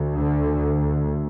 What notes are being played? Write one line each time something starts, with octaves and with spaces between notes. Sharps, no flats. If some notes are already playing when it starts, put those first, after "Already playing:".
Already playing: D2
D3